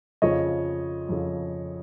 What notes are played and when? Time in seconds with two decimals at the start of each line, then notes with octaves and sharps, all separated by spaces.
0.22 F2 C#3 F3 C#5 D#5
1.09 F2 C#3 F3